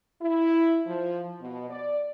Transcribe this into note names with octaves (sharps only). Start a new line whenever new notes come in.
E4
F3
B2
D5